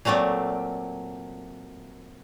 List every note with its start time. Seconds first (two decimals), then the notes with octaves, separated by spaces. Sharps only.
0.05 A#2 F#3 A3 C4 D5